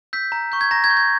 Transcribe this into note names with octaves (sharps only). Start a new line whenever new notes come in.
E6 G6 B6
A#5
C#6 G6
G#6
A#5 A#6
G#6
C#6 G6
G#6